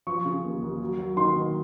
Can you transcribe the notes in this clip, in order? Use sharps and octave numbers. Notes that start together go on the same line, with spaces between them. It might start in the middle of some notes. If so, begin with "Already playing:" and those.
F3 C#6
C#3
D#2
D#2
F#3
F#3
D#3 C6
D#3